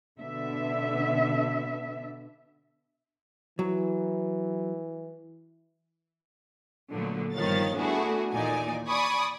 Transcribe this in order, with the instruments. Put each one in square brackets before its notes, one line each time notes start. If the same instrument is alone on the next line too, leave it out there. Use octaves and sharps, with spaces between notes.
[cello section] B2 D3 B3 D4 E5
[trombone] E3 [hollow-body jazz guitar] F#3
[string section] A#2 D3 F#3 A3 B3
G1 D#3 F3 C#5 F5 A6
A3 B3 D4 E4 F#4 G#4
D#2 A#2 E3 D#4 D5 G#5
D5 G#5 B5 C#6 D#6